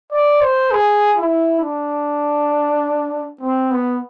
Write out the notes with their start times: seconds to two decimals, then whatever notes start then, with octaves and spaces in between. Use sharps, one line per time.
0.12 D5
0.41 C5
0.71 G#4
1.17 E4
1.61 D4
3.41 C4
3.71 B3